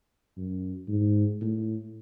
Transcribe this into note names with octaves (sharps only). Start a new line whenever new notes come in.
F#2
G#2
A2